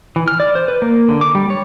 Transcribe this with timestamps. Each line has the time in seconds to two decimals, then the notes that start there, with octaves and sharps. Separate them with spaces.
0.16 E3
0.28 F6
0.40 D5
0.55 C5
0.68 B4
0.82 A#3
1.09 D3
1.21 D6
1.35 G3
1.50 C#5